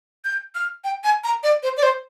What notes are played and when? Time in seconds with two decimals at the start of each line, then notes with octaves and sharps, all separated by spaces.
0.25 G6
0.55 F6
0.84 G5
1.04 G#5
1.24 A#5
1.43 D5
1.63 C5
1.77 D5
1.83 C5